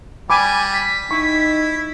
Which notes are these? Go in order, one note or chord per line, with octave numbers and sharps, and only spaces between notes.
G3 G#5 B5 D6
B6
D#4 E4 C#6